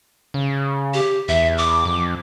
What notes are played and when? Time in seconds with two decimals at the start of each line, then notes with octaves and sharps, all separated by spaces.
0.34 C#3
0.94 G4
1.29 E2 E5
1.58 D6
1.85 F2